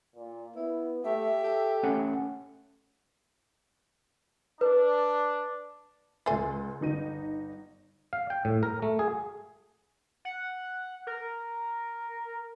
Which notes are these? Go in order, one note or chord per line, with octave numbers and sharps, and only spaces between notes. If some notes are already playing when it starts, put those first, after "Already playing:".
A#2
B3 E4
A3 G4 E5
G4 A4
A3 C#4 F#5
D4 B4
C#2 A3 C5 G#5 A6
G1 D#4 D#7
F5
G5
A2
A#4
A3
G#4
F#5
A#4